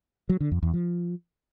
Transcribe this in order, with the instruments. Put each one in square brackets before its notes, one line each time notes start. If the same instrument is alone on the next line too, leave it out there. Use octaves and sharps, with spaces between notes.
[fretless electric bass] F#3
D3
F2
E2
F3